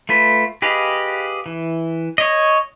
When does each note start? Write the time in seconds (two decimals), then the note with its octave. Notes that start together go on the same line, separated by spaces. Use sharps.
0.09 A3 F4 B4
0.62 G4 G#4 B4 D#5 F5
1.46 E3
2.18 C#5 D#5